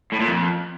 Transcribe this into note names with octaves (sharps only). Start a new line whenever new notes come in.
A2
A#2
F2